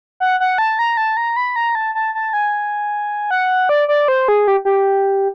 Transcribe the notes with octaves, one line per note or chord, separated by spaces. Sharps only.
F#5
F#5
A5
A#5
A5
A#5
B5
A#5
A5
A5
A5
G#5
F#5
D5
D5
C5
G#4
G4
G4